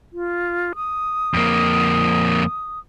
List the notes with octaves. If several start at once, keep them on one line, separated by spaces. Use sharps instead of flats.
F4
D#6
F2 A#3